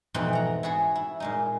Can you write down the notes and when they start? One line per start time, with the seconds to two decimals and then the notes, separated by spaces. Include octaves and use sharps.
0.14 F2 G#2 B2 E3 C4
0.33 F#5 A#5
0.63 E4 F#4 G#4 A4
0.95 E4
1.20 A#2 G#3 D#4